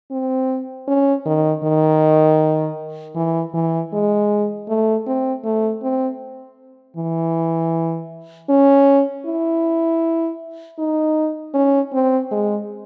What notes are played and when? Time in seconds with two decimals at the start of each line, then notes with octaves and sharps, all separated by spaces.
0.11 C4
0.87 C#4
1.26 D#3
1.64 D#3
3.16 E3
3.54 E3
3.93 G#3
4.68 A3
5.07 C4
5.44 A3
5.82 C4
6.97 E3
8.49 C#4
9.26 E4
10.78 D#4
11.54 C#4
11.93 C4
12.31 G#3